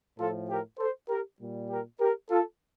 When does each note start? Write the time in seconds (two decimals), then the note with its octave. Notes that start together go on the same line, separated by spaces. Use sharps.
0.18 A2 F3 F4 A4
0.48 G4 A#4
0.79 A4 C5
1.09 G4 A#4
1.39 A#2 G3
1.69 G4 A#4
2.00 G4 A#4
2.30 F4 A4